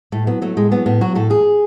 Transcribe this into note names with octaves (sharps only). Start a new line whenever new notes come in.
A2 A3
F#3 B3
F#3 A3
A2 G#3
F#3 B3
A2 B3
F#3 F#4
A2 A4
E2 G#4